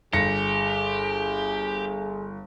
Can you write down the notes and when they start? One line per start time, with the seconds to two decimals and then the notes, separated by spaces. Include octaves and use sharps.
0.13 G1 G4 G#4 A#6 C#7